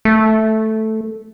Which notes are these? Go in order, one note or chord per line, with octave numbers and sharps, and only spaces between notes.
A3